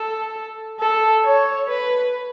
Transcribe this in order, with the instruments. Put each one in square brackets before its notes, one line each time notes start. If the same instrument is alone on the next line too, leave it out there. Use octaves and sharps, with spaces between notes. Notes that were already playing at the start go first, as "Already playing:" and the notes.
Already playing: [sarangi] A4
A4
C#5
B4